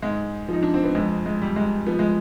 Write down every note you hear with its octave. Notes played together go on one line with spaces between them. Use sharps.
G#2 G#3
F3 D#4
D4
C4
B3
F2 G#3
G#3
G3
G#3
F3 B3
G#3